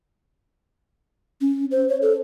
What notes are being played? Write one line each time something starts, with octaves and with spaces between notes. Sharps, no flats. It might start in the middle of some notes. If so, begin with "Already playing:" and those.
C#4
C5
C#5
A4